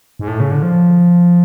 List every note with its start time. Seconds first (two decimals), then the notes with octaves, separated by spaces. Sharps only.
0.19 G#2
0.28 A2
0.40 C#3
0.51 D3
0.63 F3